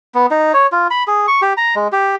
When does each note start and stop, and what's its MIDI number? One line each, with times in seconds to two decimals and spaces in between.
0.15 0.26 59
0.31 0.52 63
0.54 0.67 73
0.72 0.87 65
0.90 1.03 83
1.08 1.26 68
1.28 1.41 85
1.42 1.53 67
1.57 1.75 82
1.76 1.88 56
1.92 2.15 67